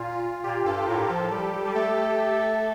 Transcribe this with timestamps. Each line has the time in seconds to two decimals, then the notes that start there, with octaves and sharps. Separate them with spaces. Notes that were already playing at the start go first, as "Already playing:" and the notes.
Already playing: A#2 F4
0.11 F4
0.44 A#2 G4
0.65 G2 A4
0.88 A2 A#4
1.09 F3 A4
1.31 G3 G4
1.53 G3 G4
1.64 G3 G4
1.75 A3 A4
2.40 A4